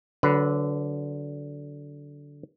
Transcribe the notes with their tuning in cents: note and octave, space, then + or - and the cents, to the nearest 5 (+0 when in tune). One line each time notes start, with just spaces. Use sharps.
D3 -15 F#3 +15 B4 +0